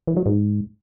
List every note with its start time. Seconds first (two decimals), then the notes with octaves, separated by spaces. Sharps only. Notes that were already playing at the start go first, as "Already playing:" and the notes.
0.07 E3
0.17 F#3
0.26 G#2